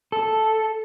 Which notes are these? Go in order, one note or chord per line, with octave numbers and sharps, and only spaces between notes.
A4